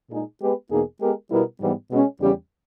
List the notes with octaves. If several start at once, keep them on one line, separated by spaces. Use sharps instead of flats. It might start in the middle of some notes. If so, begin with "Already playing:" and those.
A#2 G#3 D#4 G#4
G#3 B3 G4 B4
E2 B2 A#3 D#4 G#4
G#3 B3 G4 A#4
B2 G3 B3 E4 A#4
G#2 E3 G3 B3
B2 G#3 C#4
E2 C#3 G3 C#4 G4